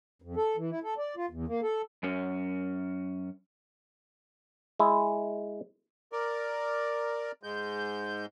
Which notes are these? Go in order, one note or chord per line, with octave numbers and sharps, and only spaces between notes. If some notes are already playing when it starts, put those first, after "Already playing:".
F2
A4
E3
E4
A4
D5
F4
E2
A#3
A4
F#2 C#4
G#3 E4
A#4 D5
G#2 G#3 G6